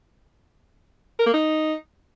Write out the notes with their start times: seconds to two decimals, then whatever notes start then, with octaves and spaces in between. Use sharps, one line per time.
1.19 A#4
1.26 A#3
1.34 D#4